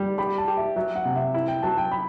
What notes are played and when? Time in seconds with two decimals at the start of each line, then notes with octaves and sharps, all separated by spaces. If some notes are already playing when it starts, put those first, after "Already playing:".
Already playing: G3
0.18 G4 B5
0.38 A5
0.48 G4
0.57 E5
0.76 F#3 E5
0.96 F#5
1.05 C3
1.15 E5
1.34 E4
1.48 G5
1.63 F#3 A5
1.78 G5
1.91 B5